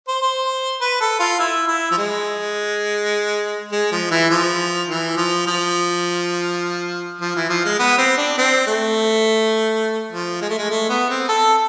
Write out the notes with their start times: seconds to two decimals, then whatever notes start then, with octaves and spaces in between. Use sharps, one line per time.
0.08 C5
0.22 C5
0.81 B4
1.01 A4
1.20 F4
1.39 E4
1.68 E4
1.91 F3
1.98 G#3
3.72 G#3
3.92 F3
4.11 E3
4.31 F3
4.89 E3
5.17 F3
5.47 F3
7.21 F3
7.36 E3
7.50 F3
7.65 G#3
7.79 B3
7.98 C4
8.18 D4
8.38 C4
8.67 A3
10.12 F3
10.42 G#3
10.49 A3
10.58 G#3
10.70 A3
10.89 B3
11.10 C4
11.29 A4